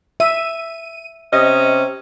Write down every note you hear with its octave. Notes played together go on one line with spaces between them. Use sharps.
E5 D#7
C3 C#4 D#5